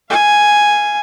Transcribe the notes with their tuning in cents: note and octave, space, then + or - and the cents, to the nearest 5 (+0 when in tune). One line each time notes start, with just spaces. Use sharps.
F5 -25 G#5 +0